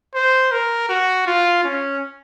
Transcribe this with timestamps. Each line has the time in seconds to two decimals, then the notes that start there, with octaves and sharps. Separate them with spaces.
0.14 C5
0.52 A#4
0.89 F#4
1.27 F4
1.64 C#4